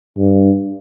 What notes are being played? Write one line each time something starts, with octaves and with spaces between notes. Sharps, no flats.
G2